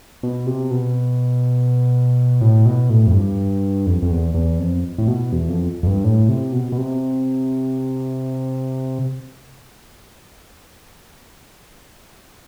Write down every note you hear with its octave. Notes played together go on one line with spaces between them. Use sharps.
B2
C3
B2
A2
B2
A2
F2
G2
F2
F2
E2
E2
F2
A2
B2
E2
F2
F2
G2
A2
C3
B2
B2
C3